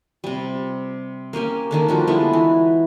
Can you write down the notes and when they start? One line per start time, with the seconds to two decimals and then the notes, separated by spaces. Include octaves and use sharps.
0.24 C3 G3
1.33 A#3 C#4 G4 G#5
1.71 D3 D#3 A#3
1.88 F3 G3 F#4 C5
2.07 D3 G#3 B3 E4
2.33 E3